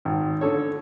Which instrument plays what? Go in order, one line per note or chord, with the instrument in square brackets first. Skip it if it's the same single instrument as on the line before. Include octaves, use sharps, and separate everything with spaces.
[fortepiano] G#1
D3 A4 C#5